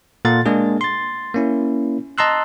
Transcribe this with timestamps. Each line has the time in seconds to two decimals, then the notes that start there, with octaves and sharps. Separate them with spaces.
0.25 A#2 A4 F5 F#5 C6 A6
0.46 G#3 A#3 D4 G#4
0.81 C6 A6
1.34 A#3 C#4 E4
2.18 D#5 A5 A#5 C6 E6 F#6